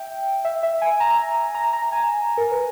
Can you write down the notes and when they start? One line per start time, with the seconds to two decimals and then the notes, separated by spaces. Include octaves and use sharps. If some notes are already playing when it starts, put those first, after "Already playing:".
Already playing: E5 G5
0.45 E5
0.63 E5
0.82 G#5
1.00 A#5
1.55 A#5
1.73 A#5
1.92 G#5
2.37 A#4
2.51 B4